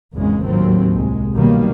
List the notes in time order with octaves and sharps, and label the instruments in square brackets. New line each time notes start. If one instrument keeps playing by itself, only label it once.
[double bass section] G#1 E2 G#2 C#3 G#3
D#2 A2 F#3 C4
C2 G#3
B2 D#3 F#3 G3 A#3